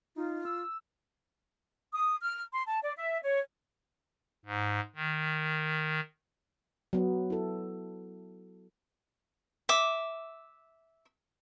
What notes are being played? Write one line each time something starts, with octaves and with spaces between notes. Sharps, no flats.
D#4 F4
E6
D#6
F6
C6
A5
D5
E5
C#5
G#2
D#3
F#3 B3
E4 A4
E5 D6